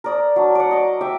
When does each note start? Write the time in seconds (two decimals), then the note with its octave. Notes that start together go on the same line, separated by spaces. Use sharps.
0.04 A#4 D5 D#6
0.36 F#3 D4
0.55 D5 F#5
0.71 D#5 D6
1.01 E5 G5 D6